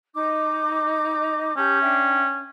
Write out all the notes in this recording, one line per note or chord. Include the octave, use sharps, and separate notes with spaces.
D#4 D#5 D6
C#4 G4 A5 G6
D4 E5 G5